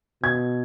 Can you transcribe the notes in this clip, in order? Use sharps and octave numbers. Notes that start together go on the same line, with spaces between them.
B2 G#6